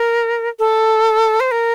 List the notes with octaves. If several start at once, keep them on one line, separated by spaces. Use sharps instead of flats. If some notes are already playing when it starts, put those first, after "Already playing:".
Already playing: A#4
A4
C5
A#4